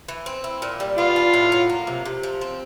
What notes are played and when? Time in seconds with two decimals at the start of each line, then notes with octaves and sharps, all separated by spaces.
0.08 E3
0.26 C4
0.44 E4
0.62 A#2
0.80 G3
0.98 B3 F4
1.16 D4
1.34 A2
1.52 F#3
1.70 A#3
1.87 C3
2.06 C3
2.23 F3
2.41 C4